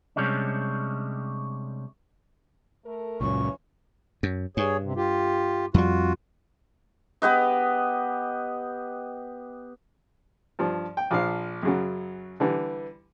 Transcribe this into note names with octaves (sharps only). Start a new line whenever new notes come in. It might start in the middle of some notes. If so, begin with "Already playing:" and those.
C3 G3 G#3 C#4 D4
A3 A4 A#4
C#2 F#2 A#2 E3 F3 C#4 C#6
F#2
G2 G#4 C#5
C3
F4 G4
F2 G3 F4 F#4
B3 G4 B4 D#5
G2 F3
G5
A#1 F3 F5
F#2 C#3 F#3
D3 E3 G3